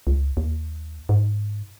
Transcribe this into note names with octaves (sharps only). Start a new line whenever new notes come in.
C#2
D#2
G#2